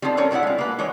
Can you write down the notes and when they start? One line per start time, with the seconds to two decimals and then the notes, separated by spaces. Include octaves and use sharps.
0.02 G3 C4 D4 D#4 F4 A4
0.17 G3 C#4 A4 A#4 C#5
0.31 B2 D3 G3 E4 F#5
0.43 G#3 F4
0.58 A#3 B4
0.78 E3 G#3 D#4 C#5 D5